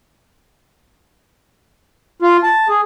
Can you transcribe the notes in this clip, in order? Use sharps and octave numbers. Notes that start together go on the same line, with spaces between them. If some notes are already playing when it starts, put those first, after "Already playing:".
F4
A5
G#4